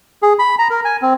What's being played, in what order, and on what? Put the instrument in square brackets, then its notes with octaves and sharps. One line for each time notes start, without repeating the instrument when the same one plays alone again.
[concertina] G#4
B5
A#5
A#4
G#5
C4